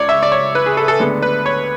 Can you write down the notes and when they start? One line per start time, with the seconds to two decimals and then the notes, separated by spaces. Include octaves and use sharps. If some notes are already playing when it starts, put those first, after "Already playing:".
Already playing: C#2 C#5 D5
0.09 E5
0.23 D5
0.32 C#5
0.55 B4
0.66 G#4
0.77 A4
0.88 A4
1.00 D2 D3 G#3 B3 D4
1.22 B4
1.46 C#5